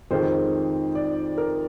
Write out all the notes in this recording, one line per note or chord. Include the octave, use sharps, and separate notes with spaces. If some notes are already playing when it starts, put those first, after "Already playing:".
F2 D#3 G#3 C5
D5
A#4